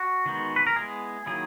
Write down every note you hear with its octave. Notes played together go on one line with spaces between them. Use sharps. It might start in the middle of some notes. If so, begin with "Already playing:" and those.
Already playing: F#4
D#3 G#3 B3 D#4
B4
A#4
G#3 B3 E4 G#4
D#3 F#3 A#3 E4 G#4